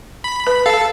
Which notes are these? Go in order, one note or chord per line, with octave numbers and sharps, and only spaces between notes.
B5
B4
A4 F5